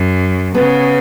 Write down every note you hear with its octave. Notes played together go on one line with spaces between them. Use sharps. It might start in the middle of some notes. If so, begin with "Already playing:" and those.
Already playing: F#2
C#3 B3